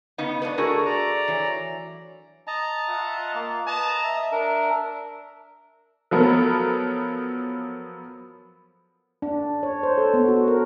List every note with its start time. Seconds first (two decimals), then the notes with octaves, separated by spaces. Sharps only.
0.18 C#3 B3 D#4
0.42 D4 F#4 B4 G#5
0.58 A3 F#4 G#4 A#4
0.85 D5 A#5
1.28 E3 F#3
2.47 D#5 A5 A#5
2.88 F4 E5 F#5
3.35 A#3
3.67 B4 D#5 A5 A#5
4.03 E5
4.32 D4 A#4
6.11 F3 F#3 B3 A4 A#4
9.22 D4
9.63 C#5
9.83 C5
9.98 A4
10.14 B3
10.28 F#4
10.48 A#4